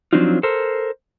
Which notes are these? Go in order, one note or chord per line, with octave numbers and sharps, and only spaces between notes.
F3 F#3 C4 D4 D#4 F4
A4 A#4 C5